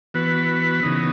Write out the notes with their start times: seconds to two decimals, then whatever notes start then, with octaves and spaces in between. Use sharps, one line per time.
0.14 E3 B3 F#4 B4
0.83 C#3 E3 B3 D#4